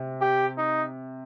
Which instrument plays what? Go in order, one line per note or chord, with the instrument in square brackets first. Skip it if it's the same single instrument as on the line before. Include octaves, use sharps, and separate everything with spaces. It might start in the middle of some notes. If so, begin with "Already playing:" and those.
Already playing: [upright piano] C3
[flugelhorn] G4
D#4